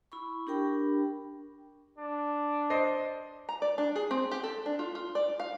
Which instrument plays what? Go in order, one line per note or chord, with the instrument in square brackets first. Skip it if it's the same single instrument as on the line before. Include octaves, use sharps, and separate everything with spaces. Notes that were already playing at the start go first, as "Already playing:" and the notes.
[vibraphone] E4 B5 C#6
D4 G4 A#4 G5 B5
[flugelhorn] D4
[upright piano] C5 D#5 C7
[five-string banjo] A#5
D5
D4
G#4
C4
G4
A4
D4
F4
F4
D5
F5